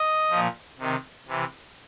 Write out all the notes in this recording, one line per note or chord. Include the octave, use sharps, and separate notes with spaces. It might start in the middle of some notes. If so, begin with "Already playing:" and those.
Already playing: D#5
A#2 F3
C3 D#3
C3 E3